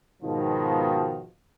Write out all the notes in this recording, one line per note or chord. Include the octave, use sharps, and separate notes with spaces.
G#2 B2 D#3 F3